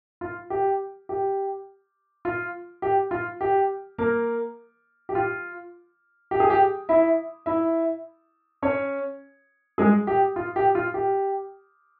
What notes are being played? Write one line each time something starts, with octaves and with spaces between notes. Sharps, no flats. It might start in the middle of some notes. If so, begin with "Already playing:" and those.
F4
G4
G4
F4
G4
F4
G4
A#3 A#4
G4
F4
G4
G#4
G4
E4 E5
E4 E5
C#4 C#5
G#3 G#4
G4
F4
G4
F4
G4